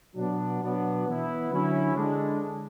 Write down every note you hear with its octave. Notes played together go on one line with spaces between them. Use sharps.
B2 F#3 B3 D4
B2 F#3 B3 D4
E3 B3 E4
D3 F#3 C#4 E4
D3 G#3 D4